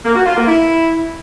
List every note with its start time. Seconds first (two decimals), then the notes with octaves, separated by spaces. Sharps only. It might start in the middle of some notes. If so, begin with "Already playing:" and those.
0.05 A#3
0.16 F#4
0.26 F4
0.37 A#3
0.47 E4